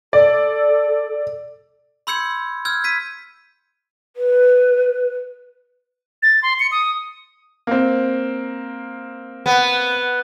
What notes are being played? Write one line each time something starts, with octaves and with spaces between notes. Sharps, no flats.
A4 D5
B5 C6 E6 G6 G#6 C#7
E6 F6 G6 G#6
G#6 B6 D#7
B4
A6
C6
C#7
D#6
A#3 C4
B3